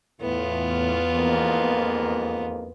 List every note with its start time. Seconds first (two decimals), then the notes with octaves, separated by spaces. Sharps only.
0.21 E2 A2 B3 F4
1.14 F2 G#2 A#3